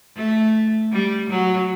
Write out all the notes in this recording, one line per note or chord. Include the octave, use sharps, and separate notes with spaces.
A3
G3
F#3